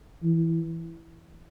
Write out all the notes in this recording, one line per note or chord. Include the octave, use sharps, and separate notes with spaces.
E3